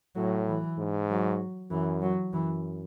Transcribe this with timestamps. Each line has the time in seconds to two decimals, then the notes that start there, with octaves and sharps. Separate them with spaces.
0.15 A2 F#3
0.47 E3
0.78 G#2
1.09 F#3
1.70 F#2 E3
2.02 F#3
2.33 F#2 E3